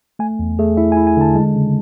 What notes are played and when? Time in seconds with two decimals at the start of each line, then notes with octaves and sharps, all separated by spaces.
0.19 A3 G#5
0.39 E2
0.59 A3 G#4
0.77 E4 E5
0.92 G#5
0.97 E4
1.07 G#5
1.17 D3 A5
1.35 G#3
1.55 C#3